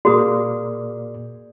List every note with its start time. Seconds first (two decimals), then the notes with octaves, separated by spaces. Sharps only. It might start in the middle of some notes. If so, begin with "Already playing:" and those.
0.05 A#2 A#3 F#4 G#4 D5 D#6